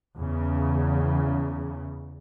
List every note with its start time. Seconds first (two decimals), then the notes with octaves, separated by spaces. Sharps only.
0.16 E2 C#3